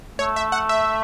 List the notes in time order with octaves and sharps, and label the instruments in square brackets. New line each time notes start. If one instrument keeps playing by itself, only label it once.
[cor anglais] A3 [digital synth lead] C#5
[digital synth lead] E5
F#5
E5